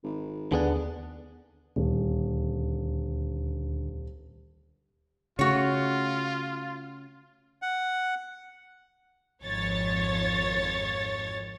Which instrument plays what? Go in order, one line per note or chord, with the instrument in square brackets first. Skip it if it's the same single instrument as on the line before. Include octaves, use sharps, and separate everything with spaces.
[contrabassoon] G#1
[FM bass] D#2 [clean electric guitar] D3 B3 D4 [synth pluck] G#4 G#5
[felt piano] D#1 [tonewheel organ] D2
[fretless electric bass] C#3 A3 [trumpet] F4 [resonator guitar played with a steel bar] F#4 C#5
[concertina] F#5
[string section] G#1 F2 C#5 A6